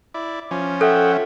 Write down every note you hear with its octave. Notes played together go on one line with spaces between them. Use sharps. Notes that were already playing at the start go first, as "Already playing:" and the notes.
E4 D5
F3 C#4
A4 E5 F#5 G5